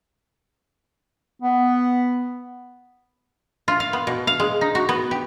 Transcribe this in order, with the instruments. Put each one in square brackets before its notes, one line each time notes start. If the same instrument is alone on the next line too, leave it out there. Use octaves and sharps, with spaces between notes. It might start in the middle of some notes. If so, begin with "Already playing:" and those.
[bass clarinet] B3
[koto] F4
F5
B3
B2
F5
G#3
D#4
F#4
B3
G4